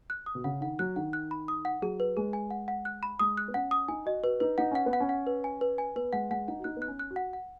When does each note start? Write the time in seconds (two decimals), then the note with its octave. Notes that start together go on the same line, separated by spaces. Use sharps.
0.10 F#6
0.26 D#6
0.35 B2
0.44 C#3 F#5
0.61 D#3 F#5
0.79 F#3 F#6
0.96 D#3 F#5
1.13 F#6
1.31 B5
1.48 D#6
1.65 F#5
1.82 F#3 G#4
2.00 B4
2.17 G#3 G#4
2.33 G#5
2.51 F#5
2.68 F#5
2.85 F#6
3.03 B5
3.19 G#3 D#6
3.37 F#6
3.48 B3
3.54 C#4 F#5
3.71 D#6
3.88 D#4 G#5
4.06 F#4 D#5
4.23 F#4 B4
4.40 D#4 B4
4.58 D#4 F#5
4.71 C#4 F#5
4.86 B3
4.93 F#5
5.00 C#4
5.09 F#5
5.27 B4
5.44 G#5
5.61 B4
5.78 G#5
5.96 B3 B4
6.13 G#3 F#5
6.30 G#3 F#5
6.48 D#4 F#5
6.59 F#4
6.64 D#4 F#6
6.76 B3
6.82 F#6
6.88 C#4
6.99 F#6
7.11 F#4
7.16 F#5
7.33 F#5